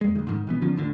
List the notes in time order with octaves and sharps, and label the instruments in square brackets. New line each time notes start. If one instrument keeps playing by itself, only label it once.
[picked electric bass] E2 G#3
D2 D#3
G#2 D3 D#3
B1 E3 B3
D3 D#3 F3 C#4
D1 D#2 A2 D3